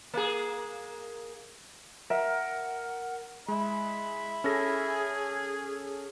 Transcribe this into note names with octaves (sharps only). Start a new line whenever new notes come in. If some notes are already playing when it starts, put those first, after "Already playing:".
A#3 G#4
A#4 E5 F#5
G#3 E5 B5
C#4 G#4 A4 A#6